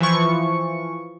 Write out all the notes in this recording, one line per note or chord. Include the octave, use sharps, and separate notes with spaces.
E3 F3 C#6